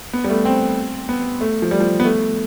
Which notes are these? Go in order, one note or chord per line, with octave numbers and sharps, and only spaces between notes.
B3
G3
A3
C4
B3
A3
F3
G3
F3
B3
A3